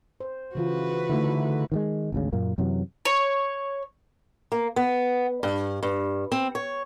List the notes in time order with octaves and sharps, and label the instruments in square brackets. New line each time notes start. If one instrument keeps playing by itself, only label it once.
[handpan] C5
[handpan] C#3 E3 F4 [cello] F#4 B4
[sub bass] D3 [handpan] A3 D#4 E4
[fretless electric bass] D#3 E3 G#3
G#1 D2 C#3
F#2 A#2 A#3
F#2 C3 E3 F#3
[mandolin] C#5
[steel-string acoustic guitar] A#3
B3
G2
G2
C4
C#5